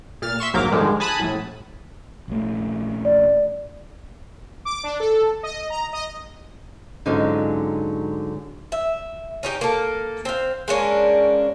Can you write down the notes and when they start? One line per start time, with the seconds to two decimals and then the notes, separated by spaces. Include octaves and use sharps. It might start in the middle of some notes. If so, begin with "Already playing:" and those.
0.22 A#2 F6 A6
0.39 E5 C6 C#6 E7
0.54 A#1 G#2 F#3 A#3 A#4 D6
0.71 G#2 D3 D#3 F3 G3 G#3
1.00 G#5 A5 B5 D#6 F#6
1.19 A#1 A2
2.28 A#1 A3
3.05 D5
4.65 D6
4.83 D4
5.00 A4
5.43 D#5
5.70 A#5
5.93 D#5
7.06 G#2 D3 F#3 C#4 D#4 F4
8.72 E5
9.43 C#4 D#4 G4
9.61 A#3 A4
10.25 C4 F5
10.68 G#3 A#3 C#4 D4